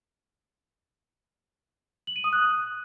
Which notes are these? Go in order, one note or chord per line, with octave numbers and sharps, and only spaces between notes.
F#7
D#7
D#6
F#6